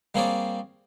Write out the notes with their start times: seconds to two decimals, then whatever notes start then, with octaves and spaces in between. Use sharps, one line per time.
0.15 G3 A#3 C4 G#4 C#5 D5